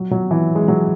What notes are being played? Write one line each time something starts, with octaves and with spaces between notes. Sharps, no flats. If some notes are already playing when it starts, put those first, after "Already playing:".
Already playing: F#3
F#3
E3
G#3
F#3